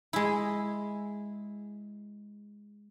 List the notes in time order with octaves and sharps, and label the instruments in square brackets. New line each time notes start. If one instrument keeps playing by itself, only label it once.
[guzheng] G#3 E4